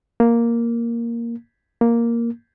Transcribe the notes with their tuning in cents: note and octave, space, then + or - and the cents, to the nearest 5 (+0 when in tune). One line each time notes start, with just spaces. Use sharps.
A#3 +0
A#3 +0